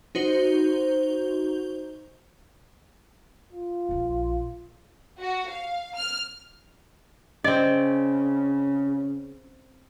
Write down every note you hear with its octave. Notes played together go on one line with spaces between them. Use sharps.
D#4 F#4 C5 G7
F4
A#1 F3
F#4
F5
F6
C#3 C4 D5 D#5